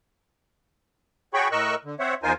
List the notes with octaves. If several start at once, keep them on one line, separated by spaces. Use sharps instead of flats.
F#4 G#4 C#5 G5 B5 C#6
A2 A#4 D#5 C#6 E6 F#6
D3
C4 C5 C#5 E5 F#5
E2 D#4 F4 A#4 C5 G#5